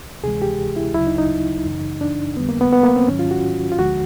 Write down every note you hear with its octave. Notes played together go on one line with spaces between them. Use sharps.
D2 C3 E3 G#3 G#4
G4
E4
D2 C#3 F#3 E4
D#4
D#4
F#2 C#3 E3
D4
F2 D3 G3 B3
A#3
B3
B3
A#3
C4
G#2 D#3 F#3 C#4
F4
F#4
F4
D2 D3 F3 G#3 F#4